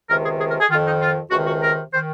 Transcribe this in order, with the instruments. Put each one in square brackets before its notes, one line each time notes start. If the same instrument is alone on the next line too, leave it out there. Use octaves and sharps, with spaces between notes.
[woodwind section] C#2 C3 D#3 A#4
G#4
G#4
A#4
G#4
D#3 F4
F2
D#4
F4
C#2 F#4
C3 D#3
F#4
A#4
D#3 C5